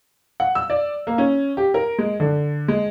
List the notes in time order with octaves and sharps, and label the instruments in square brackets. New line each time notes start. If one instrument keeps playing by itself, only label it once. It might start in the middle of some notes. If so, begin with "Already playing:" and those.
[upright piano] F#5
E6
D5
A#3
C#4
G4
A#4
G#3
D3
G#3